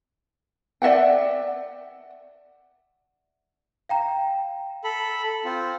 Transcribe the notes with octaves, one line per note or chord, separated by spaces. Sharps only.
D5 E5 F#5 G5
F5 G5 A#5
A4 B5
C4 F4